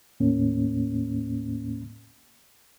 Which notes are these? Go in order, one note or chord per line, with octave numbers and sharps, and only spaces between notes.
D#2 A2 A#3 C#4